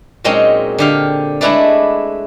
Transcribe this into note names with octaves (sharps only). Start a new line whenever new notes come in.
A#2 F#3 G#3 C4 C#4 D#4
D3 G4 F5
G#3 A3 D4 E4 B4 D5